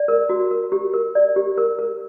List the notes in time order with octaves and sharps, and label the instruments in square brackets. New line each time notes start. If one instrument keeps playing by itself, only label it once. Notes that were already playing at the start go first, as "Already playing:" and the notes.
Already playing: [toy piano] D5
A#4
F#4
A#4
G4
A#4
D5
G4
A#4
A#4